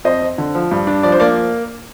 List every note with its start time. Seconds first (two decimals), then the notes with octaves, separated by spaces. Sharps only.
0.04 F2 C5 D#5
0.22 C4
0.38 D3
0.55 F3
0.71 G2
0.87 D4
1.03 F3 D5
1.12 C5
1.20 A#3 D5